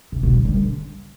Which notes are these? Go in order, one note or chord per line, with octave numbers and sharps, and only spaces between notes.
C3
B2
F#3
G3
D3